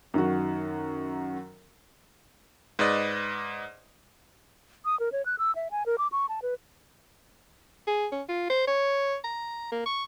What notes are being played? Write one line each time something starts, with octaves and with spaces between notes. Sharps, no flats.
F#2 D#3 F#4
G#2 B4 D5 D#5
D#6
A#4
C#5
F#6
E6
E5
G#5
A#4
D6
C#6
A5
B4
G#4
C#4
F4
C5
C#5
A#5
A#3
C#6